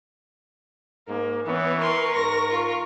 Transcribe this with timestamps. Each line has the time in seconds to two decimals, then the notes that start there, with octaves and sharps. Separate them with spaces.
1.08 G#2 A#3
1.46 E3 B3 C#5
1.80 A#4 B4 C6 C#6
2.16 G#2 A#6
2.50 F4